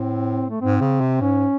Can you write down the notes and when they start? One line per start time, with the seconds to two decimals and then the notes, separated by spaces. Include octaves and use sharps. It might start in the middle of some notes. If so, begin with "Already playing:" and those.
Already playing: A2 C4
0.50 A3
0.61 G#2 C4
0.81 C#3
1.01 C3
1.21 G#2 C#4